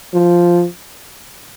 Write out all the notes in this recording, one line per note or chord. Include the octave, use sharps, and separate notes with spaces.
F3